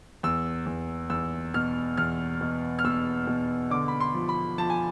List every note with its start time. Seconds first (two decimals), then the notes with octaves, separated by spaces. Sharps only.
0.23 E2 E6
0.66 E2
1.10 E2 E6
1.54 B2 F6
1.97 E2 F6
2.41 B2
2.79 F6
2.84 B2 E6
3.27 B2
3.70 D3 D6
3.88 B5
4.00 C6
4.14 F3
4.29 B5
4.58 F3 A5
4.70 G#5